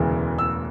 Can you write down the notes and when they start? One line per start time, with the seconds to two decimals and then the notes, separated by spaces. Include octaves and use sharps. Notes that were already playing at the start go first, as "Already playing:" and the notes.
Already playing: E1 D2 C#3 E3 B3
0.39 E6